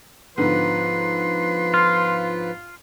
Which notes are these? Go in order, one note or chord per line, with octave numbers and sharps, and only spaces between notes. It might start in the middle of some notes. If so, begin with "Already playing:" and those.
G#2 D3 F3 B3 B4 C6
F4